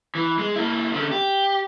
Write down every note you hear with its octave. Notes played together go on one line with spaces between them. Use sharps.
E3
G#3
A#3 E4
D3 C#4
G4